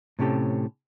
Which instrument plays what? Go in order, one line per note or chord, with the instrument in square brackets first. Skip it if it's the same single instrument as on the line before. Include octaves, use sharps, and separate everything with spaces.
[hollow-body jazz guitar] A2 C3 C#4 G4 A4